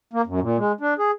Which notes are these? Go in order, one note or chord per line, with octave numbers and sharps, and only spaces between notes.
A#3
F#2
A#2
G#3
D4
G#4